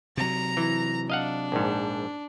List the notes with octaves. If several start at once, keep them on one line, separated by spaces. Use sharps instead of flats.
C3 F#3 A#5
E3
D4 D#5 F5 F#5
A#1 G#2